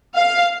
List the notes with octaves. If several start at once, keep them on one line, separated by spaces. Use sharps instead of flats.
F5